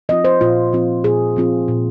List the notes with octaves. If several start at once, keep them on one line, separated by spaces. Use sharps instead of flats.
F3 C4 F4 D#5
C5
A#2 F4
F3 C4 F4
A#2 G#4
F3 C4 F4
A#2